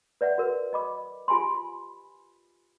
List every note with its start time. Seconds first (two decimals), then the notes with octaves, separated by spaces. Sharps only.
0.21 B4 D5 E5 F#5
0.38 F#4 A#4 B4
0.73 D#5 B5 D6
1.28 F4 G4 G#5 B5 C6